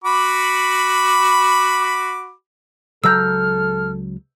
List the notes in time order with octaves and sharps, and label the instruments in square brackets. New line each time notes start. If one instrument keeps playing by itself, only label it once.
[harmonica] F#4 B5 D6
[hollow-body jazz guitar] C#2 F#3 A#5 [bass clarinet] A4 [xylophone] E6 G6 [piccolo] F6